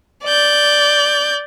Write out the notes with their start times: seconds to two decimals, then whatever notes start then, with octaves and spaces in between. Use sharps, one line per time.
0.24 D5 G6